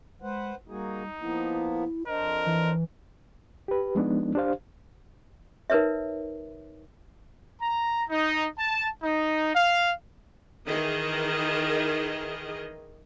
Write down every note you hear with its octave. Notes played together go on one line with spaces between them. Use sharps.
G#3 B4 C5 F#5
G3 A#3 D#4 F#4 G#4
F3 A#3 B3 E4
F2 D4 A#4 C5 D#5
E3
G4 B4
F3 G#3 B3 D4 D#4
D4 G4 C5 F5
D#4 A#4 B4 C#5 E5
A#5
D#4
A5
D#4
F5
D#3 E3 G#4 D#5